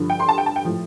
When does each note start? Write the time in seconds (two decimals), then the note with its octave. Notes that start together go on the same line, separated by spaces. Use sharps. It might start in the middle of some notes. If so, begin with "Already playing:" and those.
Already playing: G2 D3 F3
0.10 G5
0.20 C6
0.29 A5
0.38 G5
0.46 A5
0.56 G5
0.65 A2 F3